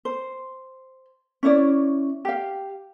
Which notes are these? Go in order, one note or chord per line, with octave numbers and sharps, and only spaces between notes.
C5
C#4 E4 C#5 D5
G4 F5